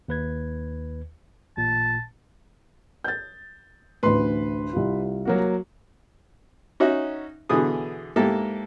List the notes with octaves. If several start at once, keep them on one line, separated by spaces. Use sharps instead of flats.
D#2 B4 G#6
A1 A#2 A5
G6 A6
A1 D2 B4 C6
C2 F4
F#3 A#3 F#4
C#4 D#4 F#4 E5
B2 D3 E3 B3 G#4 D#6
G#2 A#3 E4 G4 A4 A5